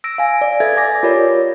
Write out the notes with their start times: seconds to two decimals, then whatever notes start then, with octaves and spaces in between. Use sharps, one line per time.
0.04 E6 A#6 D7
0.18 F5 G#5
0.41 D5
0.60 A4 B4 E5 G#6 A6
0.77 G#5 D6 A6 A#6
1.03 F4 G4 A#4 C#5 D5